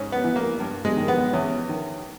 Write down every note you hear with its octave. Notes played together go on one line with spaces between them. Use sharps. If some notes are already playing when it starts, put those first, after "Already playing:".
Already playing: G#2 C#4
B3
E3
A#3
G2
G#3
D#3
B3
E2 C#4
D#3